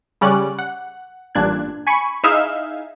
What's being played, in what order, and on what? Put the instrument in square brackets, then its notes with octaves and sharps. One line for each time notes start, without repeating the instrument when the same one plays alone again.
[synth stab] C#3 G3 C#4 D5 F#6
F#5
A1 G2 A#2 D4 F#6 G#6
G#5 B5 C#6
D#4 E4 G#4 E5 F5